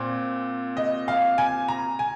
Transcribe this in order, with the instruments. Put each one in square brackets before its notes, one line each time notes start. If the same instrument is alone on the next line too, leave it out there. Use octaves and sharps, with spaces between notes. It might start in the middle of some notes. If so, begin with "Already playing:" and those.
Already playing: [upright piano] A#2 C4
D#5
F5
G#5
A#5
G#5